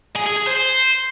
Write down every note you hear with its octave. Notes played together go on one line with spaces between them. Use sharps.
G#4
G#4
G#4
C5